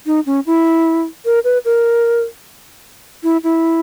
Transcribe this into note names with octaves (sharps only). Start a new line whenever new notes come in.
D#4
C#4
E4
A#4
B4
A#4
E4
E4